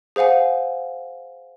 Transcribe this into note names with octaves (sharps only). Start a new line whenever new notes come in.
G#4 C5 F5 F#5 G#5